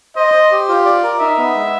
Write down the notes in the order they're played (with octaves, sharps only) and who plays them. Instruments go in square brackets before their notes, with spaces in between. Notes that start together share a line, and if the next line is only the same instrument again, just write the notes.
[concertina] C5 [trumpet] D#5
[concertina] C5
G4
F4
D5
A#4
[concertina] D#4 [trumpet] E5
[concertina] B3
G#3